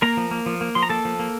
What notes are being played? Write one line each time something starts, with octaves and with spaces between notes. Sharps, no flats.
A#3 A#4 A#5
F3
A#3
F3
A#3
F3 C6
A#5
A#3 A4 A5
F3
A#3